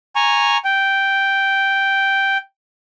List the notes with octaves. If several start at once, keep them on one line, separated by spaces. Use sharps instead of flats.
G#5 A#5 C#6
G5